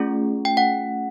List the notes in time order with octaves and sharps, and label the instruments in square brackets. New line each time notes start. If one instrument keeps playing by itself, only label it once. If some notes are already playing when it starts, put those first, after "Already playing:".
Already playing: [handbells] A3 C#4 F4 G#4
G5
F#5